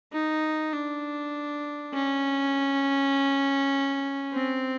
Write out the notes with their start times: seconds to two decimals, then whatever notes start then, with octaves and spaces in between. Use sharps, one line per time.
0.13 D#4
0.73 D4
1.94 C#4
4.33 C4